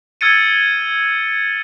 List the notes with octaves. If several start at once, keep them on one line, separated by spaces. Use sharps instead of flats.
E6 F6 G#6 A6 C#7 D#7